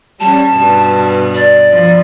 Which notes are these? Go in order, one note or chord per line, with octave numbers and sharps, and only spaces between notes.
G3 C#4 A5
G2 B2
D5
F3